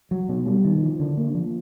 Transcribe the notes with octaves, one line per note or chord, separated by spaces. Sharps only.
F#3
B2
G3
D#3
F3
D3
A#3
F3